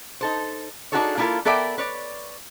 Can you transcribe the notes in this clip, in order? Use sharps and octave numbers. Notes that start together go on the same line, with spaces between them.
D#4 A4 C5
D4 D#4 F#4 G#4 A4 C#5
A#3 D4 E4 F4 A4 A#4
B3 A4 A#4 D5 E5 G5
B4 C#5 D5